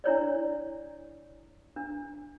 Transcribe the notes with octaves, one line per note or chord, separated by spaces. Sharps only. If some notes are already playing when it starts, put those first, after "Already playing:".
D4 E4 C#5 D5
D4